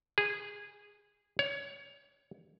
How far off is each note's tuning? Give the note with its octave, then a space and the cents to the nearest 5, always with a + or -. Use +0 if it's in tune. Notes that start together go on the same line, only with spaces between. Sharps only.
G#4 -15
C#5 +25